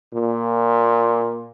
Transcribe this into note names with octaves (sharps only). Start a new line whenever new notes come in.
A#2